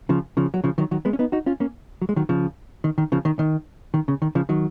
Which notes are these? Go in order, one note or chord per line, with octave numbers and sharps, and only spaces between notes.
C#3 F3
C#3 F3
F#3
C#3 F3
D#3 F#3
D#3 F#3
G#3 B3
C#4
B3 D#4
D#4 F#4
C#4 F4
A#3 C#4
F#3
G#3
D#3 F#3
C#3 F3
D#3
D#3
C#3 F3
D#3
D#3
D#3
C#3
D#3
C#3 F3
D#3 F#3